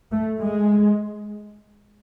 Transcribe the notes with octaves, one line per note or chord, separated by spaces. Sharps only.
A3
G#3